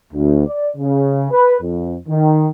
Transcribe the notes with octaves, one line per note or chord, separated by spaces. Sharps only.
D2
D5
C#3
B4
F2
D#3